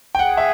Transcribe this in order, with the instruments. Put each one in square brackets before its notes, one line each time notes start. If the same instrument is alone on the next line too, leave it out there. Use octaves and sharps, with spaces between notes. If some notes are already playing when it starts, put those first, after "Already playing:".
[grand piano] G5
[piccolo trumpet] G#4 [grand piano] F#5
[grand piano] E5